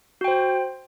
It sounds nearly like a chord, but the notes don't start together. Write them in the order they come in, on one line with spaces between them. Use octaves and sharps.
F#4 G5 C5